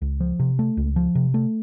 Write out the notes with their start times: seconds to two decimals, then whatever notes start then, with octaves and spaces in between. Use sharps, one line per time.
0.02 C#2
0.20 F3
0.39 C3
0.59 A3
0.77 C#2
0.96 F3
1.15 C3
1.34 A3